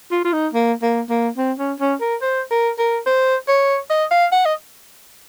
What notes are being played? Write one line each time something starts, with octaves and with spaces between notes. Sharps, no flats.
F4
F4
D#4
A#3
A#3
A#3
C4
C#4
C#4
A#4
C5
A#4
A#4
C5
C#5
D#5
F5
F#5
D#5